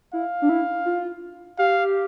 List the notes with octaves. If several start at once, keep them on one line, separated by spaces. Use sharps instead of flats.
E4 F5
D4
E4
F4
G4 F5